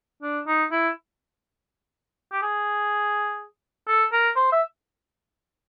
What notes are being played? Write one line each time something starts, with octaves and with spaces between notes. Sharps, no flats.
D4
D#4
E4
G4
G#4
A4
A#4
C5
E5